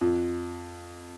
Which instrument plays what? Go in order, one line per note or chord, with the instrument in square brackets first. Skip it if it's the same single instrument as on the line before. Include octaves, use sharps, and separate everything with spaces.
[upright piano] F2